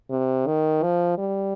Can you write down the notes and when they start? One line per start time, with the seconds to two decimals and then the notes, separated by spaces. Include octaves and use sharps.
0.10 C3
0.46 D#3
0.83 F3
1.18 G3